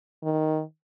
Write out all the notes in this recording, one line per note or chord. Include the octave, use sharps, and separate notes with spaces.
D#3